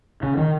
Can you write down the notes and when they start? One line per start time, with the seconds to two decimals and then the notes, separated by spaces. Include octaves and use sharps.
0.23 C#3
0.37 D#3